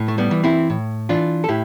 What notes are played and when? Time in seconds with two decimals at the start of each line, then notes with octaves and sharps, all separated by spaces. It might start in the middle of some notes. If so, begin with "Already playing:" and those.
Already playing: A2
0.08 A3
0.18 G3 B3
0.31 E3
0.44 C4 E4
0.70 A2
1.09 E3 D4 F4
1.44 A4
1.49 A2 E4 G4